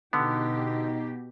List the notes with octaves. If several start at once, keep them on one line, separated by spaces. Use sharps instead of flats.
B2 D3 B3 D#4 G4